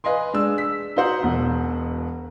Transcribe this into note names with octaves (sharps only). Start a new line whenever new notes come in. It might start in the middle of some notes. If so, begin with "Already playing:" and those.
B4 D#5 F5 G#5 C6
G#3 D4 E6
B6
D#4 F#4 C5 F#5
E1 B2 F#5